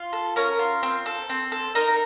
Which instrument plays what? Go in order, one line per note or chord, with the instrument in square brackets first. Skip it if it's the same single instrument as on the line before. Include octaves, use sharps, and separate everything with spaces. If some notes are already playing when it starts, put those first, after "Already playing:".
Already playing: [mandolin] F4
A4
C#4 A#4
F4
C4
A4
C4
A4
D#4 A#4